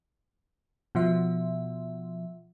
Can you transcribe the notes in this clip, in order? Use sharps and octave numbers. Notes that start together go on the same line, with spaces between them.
B2 F3 E5